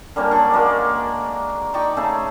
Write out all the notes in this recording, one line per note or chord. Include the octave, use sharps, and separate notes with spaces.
D3 G3 A#3 C#4
F#3 D4 C#6
G#3 A#3 F#4
D#4 D5 G5 C#6
C#3 A3 G#4